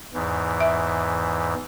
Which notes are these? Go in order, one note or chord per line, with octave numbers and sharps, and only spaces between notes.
E2 G#2 E3
E5